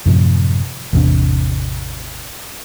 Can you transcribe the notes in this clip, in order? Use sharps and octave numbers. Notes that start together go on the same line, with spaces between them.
F#2 A2 C3 F3
A1 E2 C3 D4